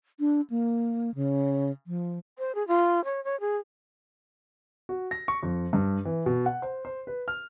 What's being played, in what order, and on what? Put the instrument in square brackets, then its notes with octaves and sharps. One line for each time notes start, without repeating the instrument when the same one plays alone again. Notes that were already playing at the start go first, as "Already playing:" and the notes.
[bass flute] D4
A#3
C#3
F3
[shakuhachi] C5
G#4
F4
C#5
C#5
G#4
[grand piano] F#4
A#6
C#6
F2
G2
E3
B2
F#5
C5
C5
B4
F6